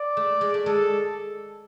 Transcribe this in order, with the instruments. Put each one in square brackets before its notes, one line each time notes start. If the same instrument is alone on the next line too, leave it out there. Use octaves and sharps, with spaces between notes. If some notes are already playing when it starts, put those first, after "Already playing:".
Already playing: [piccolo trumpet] D5
[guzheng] A3
G#3
A3
[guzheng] G#3 [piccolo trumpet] A4